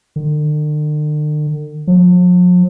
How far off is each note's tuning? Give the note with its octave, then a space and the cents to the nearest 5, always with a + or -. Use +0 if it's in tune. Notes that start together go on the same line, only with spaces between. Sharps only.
D3 +45
F3 +45